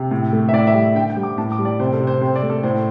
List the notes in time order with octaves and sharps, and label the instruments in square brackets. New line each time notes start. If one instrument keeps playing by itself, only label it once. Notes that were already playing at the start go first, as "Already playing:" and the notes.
Already playing: [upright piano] C3
A2
A3
E5
A2 D5
E5
G3
D3 G5
G5
G3
D6
A2 A5
D6
G3
D5
C3 C5
A4
C3
C5
C3 C5
D5
A3
A4
A2 C5